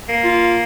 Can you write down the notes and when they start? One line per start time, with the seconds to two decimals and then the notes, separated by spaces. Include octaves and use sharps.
0.09 A#3
0.24 F4